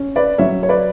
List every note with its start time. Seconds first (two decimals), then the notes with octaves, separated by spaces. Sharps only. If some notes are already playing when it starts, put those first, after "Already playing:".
Already playing: C#4
0.16 B4 D5
0.38 F#3 C#5 E5
0.63 C#5
0.69 B4 D5